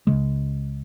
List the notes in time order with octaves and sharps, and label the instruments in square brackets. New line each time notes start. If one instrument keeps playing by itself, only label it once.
[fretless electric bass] C#2 C#3 G#3